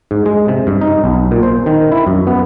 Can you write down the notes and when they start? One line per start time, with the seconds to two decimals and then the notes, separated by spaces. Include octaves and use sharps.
0.11 G#2
0.26 G#3
0.48 C3
0.67 G2
0.81 D#4
1.04 B1
1.31 A#2
1.43 C5
1.66 D#3
1.92 E4
2.07 F#2
2.27 B3